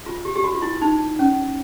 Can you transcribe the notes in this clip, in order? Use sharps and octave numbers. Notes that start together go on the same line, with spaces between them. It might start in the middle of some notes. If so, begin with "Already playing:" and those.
F4
G4
G4
F#4
F4
E4
D#4
C#4